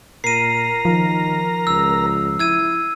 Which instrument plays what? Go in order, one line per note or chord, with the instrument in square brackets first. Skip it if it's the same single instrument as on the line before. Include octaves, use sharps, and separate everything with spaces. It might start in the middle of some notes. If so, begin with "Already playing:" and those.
[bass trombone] A#2 [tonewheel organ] A#4 A#5 [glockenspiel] C7 D#7
[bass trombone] D#3 [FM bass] F3
[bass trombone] C#2 [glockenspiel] E6
[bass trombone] E4 [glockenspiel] E6 G#6 D#7